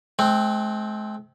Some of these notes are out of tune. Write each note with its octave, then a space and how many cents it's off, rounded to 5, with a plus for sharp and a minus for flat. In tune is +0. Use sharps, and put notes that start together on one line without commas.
G#3 +45 C4 +0